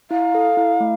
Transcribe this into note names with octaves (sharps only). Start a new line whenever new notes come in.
E4 F5
A4
E4
A3